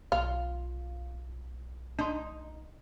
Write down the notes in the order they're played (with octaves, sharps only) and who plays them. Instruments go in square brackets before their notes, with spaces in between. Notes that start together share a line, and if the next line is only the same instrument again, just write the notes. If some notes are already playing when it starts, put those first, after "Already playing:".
[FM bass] B1 [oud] F4 [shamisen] F5
[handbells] D4 C6 [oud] D#4